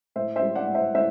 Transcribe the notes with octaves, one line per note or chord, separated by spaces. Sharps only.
A2 C5 E5
C5 E5
G3
D5 F#5
A2
C5 E5
A2 C5 E5